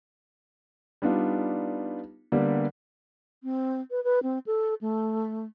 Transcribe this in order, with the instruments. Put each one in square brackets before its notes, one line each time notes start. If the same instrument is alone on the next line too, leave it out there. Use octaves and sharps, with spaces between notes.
[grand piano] G3 B3 D4 D#4 F4
D3 G3 A#3 B3 G4
[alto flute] C4
B4
B4
C4
A4
A3